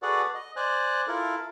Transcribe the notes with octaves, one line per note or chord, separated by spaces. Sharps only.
F#4 G#4 A4 B4 D5 F#5
D#5
C5 D5 G#5 F#6
E4 F4 A4 A#4